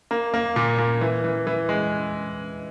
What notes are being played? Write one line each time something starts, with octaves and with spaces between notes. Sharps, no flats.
A#3
A#3
A#2
A#2
E3
E3
E3
G#3